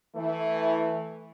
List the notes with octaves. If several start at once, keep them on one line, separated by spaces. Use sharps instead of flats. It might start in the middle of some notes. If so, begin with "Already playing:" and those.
E3 A3